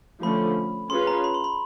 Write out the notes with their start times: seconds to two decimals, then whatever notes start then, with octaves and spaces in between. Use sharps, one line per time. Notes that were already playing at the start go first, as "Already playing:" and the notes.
0.22 D3 F3 A3 C#4 B5
0.90 C#4 F4 G#4 B4 C6
1.07 A#5
1.24 B5
1.34 C6
1.44 B5